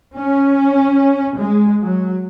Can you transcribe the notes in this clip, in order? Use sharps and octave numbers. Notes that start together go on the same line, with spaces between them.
C#4
G#3
F#3